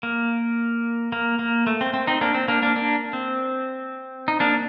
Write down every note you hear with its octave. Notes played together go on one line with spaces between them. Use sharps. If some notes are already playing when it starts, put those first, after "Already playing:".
A#3
A#3
A#3
A3
C4
C4
C4 D#4
A#3 D4
C4
A#3 D4
A#3 D4
A#3 D4
C4
D#4
A#3 D4